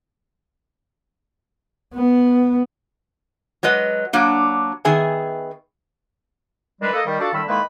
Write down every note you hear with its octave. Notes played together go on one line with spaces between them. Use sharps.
B3
F#3 G#3 B4 D#5
F#3 A#3 D4
D#3 B3 G#4 E5 G#5
D#3 E3 G3 G#3 D4 B4
A#3 A4 D#5
D#3 G3
D4 F4 F#4 A4 A5
A2 D3 D#3 G3 B5 E6
A2 D#3 G#3 A#3 B4 B5